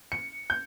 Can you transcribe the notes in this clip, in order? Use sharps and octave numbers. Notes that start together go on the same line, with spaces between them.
C#7
G6